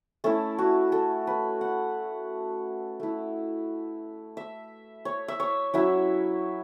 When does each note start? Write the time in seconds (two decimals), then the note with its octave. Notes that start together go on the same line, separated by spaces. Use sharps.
0.24 A3 C#4 E4 A4
0.59 F#4
0.92 A4
1.27 B4
1.61 F#5
3.00 A3 E4
4.37 E5
5.05 C#5
5.28 E5
5.40 C#5
5.74 F#3 C#4 E4 E5